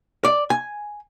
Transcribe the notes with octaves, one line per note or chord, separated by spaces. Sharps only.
D5
G#5